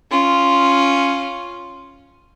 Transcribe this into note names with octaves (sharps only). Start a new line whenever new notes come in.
C#4 F4